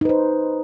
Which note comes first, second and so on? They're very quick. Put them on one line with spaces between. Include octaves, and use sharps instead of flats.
D#4 B4 C5